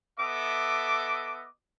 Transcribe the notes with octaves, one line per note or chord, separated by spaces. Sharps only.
B3 A4 D#5 E5 D6